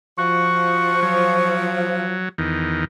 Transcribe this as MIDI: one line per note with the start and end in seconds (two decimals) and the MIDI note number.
0.18 2.31 53
0.18 1.00 66
0.18 1.89 85
1.03 2.29 54
2.38 2.85 40
2.38 2.85 51